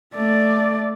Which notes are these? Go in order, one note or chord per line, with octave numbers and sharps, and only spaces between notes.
A3 D5